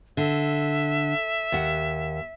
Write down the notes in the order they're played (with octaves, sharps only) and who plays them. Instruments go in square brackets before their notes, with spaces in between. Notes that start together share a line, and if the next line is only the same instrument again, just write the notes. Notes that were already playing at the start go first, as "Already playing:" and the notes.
[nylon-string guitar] D3 [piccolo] E5
[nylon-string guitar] D#2 F#5